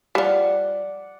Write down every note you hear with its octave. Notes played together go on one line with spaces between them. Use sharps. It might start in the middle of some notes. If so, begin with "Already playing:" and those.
F3 G3 D5 F#5